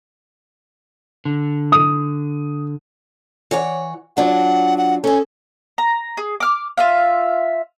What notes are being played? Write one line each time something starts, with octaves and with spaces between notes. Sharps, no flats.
D3
D#6
E3 C#5 F#5
F#3 D4 F4 F#5
F#5
C#4 G#4 A4
A#5
G#4
D6 F6
F4 E5 F5